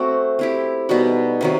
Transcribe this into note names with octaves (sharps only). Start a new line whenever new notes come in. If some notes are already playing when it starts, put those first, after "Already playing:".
Already playing: A3 C4 F#4
C4 E4 G4
B2 G3 D#4 F#4
C3 D#3 F#3